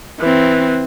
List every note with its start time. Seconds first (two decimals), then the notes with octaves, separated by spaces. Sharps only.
0.20 E3 C4